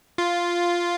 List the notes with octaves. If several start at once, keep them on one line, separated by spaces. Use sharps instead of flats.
F4